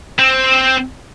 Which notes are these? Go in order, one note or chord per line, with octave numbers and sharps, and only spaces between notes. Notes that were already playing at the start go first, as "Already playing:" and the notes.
C4